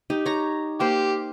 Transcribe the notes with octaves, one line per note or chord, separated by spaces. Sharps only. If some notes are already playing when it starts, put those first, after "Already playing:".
D#4 G4
C#5 A#5
A#3 G4 C5